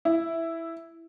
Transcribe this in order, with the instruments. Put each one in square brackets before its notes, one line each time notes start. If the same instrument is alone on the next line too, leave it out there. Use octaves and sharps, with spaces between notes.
[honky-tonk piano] E4